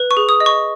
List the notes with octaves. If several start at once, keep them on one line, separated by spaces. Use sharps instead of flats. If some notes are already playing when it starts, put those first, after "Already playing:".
Already playing: B4
C#6
G#4
D#6
D#5
C#6